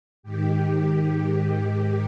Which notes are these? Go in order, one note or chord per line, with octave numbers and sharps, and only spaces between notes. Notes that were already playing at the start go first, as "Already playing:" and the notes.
G#2 D#3 G4